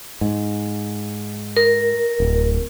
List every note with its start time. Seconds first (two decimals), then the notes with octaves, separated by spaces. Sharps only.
0.21 G#2
1.57 A#4
2.20 D1